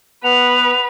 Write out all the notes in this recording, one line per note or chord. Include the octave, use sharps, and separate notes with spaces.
B3 B4 F#5 F7